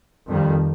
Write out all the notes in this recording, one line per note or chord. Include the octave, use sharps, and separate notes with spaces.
F2 D#3 G3